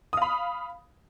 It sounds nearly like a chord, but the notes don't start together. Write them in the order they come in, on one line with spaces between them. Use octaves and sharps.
D#6 F5 B5